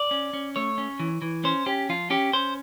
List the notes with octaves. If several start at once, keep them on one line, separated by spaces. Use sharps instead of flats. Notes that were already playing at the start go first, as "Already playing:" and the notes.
Already playing: D5
C#4
C#4
A3 C#5
C#4
E3
E3
C#4 C5
C#4 G4
F3 F4
C#4 G4
C#4 C5